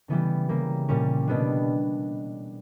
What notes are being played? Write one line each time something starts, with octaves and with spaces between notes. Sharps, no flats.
C#3 E3 G3 B3
C#3 G3 A#3
A#2 G3 C#4
B2 G3 B3 D4